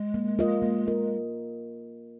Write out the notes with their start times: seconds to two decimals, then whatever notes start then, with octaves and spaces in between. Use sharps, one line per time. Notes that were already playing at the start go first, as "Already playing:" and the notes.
Already playing: G#3
0.14 A#3
0.39 F4 A#4 D#5
0.62 A#3
0.87 F4 A#4 D#5